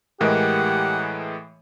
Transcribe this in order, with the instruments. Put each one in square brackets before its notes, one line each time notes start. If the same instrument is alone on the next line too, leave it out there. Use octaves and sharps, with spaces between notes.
[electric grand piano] A2 E3 G#3 [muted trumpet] G4 [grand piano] A#4 D#5 [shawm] F#5